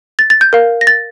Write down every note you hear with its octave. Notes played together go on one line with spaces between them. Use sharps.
A6
A6
G6
A#4 F5
A#6
A6